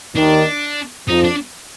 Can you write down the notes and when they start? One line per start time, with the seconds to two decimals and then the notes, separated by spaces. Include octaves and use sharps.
0.16 D#2 D#3 D4
1.08 F2 F3 D#4
1.23 D4